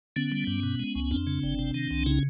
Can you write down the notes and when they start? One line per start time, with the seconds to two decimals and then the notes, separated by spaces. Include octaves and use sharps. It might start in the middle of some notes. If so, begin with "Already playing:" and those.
0.16 D3 B3 C#4
0.32 G3
0.47 G2
0.63 B2
0.80 G#3
0.95 C#2
1.11 F2 C4 D4
1.27 C#3
1.43 G1
1.59 C3
1.74 D#3
1.91 C2
2.06 C#3 C#4 D#4